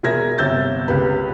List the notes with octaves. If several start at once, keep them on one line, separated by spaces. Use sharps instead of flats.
E1 G#4 A#4 E5 G#6 A#6
G1 C3 E6 G6 A6
C#2 G4 B4